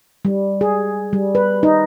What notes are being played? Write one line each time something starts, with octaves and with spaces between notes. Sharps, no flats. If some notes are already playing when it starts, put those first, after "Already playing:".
G3
G#4
G3
B4
D#4